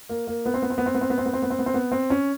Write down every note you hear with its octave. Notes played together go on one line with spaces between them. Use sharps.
A#3
A#3
B3
C4
B3
C4
B3
C4
B3
C4
B3
C4
B3
C4
B3
C4
B3
C4
B3
C4
C#4